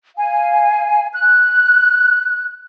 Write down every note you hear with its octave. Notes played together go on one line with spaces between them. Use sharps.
F5 G#5
F#6